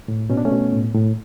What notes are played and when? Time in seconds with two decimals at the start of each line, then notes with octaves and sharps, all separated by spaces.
0.08 A2
0.30 B2 C#4
0.37 D4
0.45 A3 C#4
0.51 B2
0.73 A2
0.94 A2